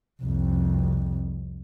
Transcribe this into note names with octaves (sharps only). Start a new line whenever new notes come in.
C2 F2